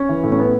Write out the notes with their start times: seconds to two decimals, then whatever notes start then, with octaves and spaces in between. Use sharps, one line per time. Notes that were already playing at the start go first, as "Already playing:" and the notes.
Already playing: C#4
0.09 E3
0.24 A2
0.32 C#4
0.39 B3